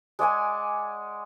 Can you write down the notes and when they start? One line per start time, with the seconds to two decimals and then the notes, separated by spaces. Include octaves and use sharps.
0.19 G#3 D5 F#5 G#5